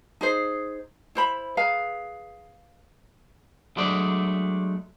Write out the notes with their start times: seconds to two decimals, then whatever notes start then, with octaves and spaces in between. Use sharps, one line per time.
0.21 D#4 G#4 C5
1.15 E4 C5 B5
1.57 G#4 B4 F5 A#5
3.77 F#3 G#3 A3 D4 D5